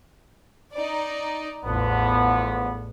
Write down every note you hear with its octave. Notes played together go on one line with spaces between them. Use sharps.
D#4 D5
A1 E2 D3 F3 B3